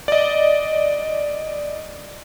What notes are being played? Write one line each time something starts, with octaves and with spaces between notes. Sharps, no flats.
D5 D#5